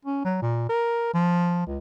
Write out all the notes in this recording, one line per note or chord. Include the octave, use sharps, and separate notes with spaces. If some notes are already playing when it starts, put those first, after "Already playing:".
C#4
F#3
A#2
A#4
F3
C#2